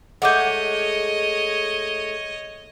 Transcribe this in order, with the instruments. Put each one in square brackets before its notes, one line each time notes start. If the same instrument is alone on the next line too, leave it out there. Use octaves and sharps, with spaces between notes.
[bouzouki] G#3 A3 [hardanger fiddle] C#5 D#5 [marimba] F#5 D6 G6